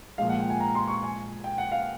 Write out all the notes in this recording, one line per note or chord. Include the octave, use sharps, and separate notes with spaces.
A#2 F3 G#3 F5
F#5
G5
G#5
A#5
C6
C#6
G#5
G5
F#5
F5